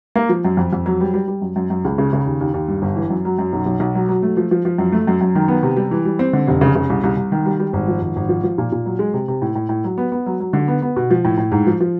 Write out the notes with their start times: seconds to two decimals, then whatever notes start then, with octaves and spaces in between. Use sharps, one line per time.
0.16 A#3
0.29 F3
0.44 F#2
0.57 F2
0.73 F2
0.86 F#3
1.01 G3
1.14 G3
1.28 G3
1.41 F#2
1.56 F#2
1.70 F#2
1.84 C#2
1.98 C#3
2.13 C#3
2.26 D#2
2.41 D#2
2.54 D#2
2.68 G2
2.82 G1
2.96 E3
3.10 F#2
3.25 F#3
3.38 F#2
3.53 B1
3.66 B1
3.80 B1
3.95 F#3
4.09 F#3
4.23 A3
4.37 F3
4.51 F3
4.65 F3
4.78 F#2
4.92 A3
5.07 F#2
5.21 F#2
5.35 D#3
5.48 B3
5.63 C3
5.76 G3
5.91 E3
6.05 G3
6.19 C4
6.33 D3
6.48 F1
6.61 C#3
6.75 C#3
6.90 C2
7.03 C2
7.17 C2
7.32 D#3
7.46 G3
7.59 G3
7.73 G#1
7.88 F3
8.02 G#1
8.16 G#1
8.29 F3
8.44 F3
8.58 A#2
8.72 A#2
8.86 F#3
8.99 G#3
9.14 C3
9.28 C3
9.42 A2
9.55 A2
9.69 A2
9.84 F#3
9.98 B3
10.12 B3
10.26 F#3
10.40 F#3
10.53 D3
10.68 B3
10.82 B3
10.96 B2
11.10 F3
11.25 A2
11.37 A2
11.51 G#2
11.67 F3
11.80 F3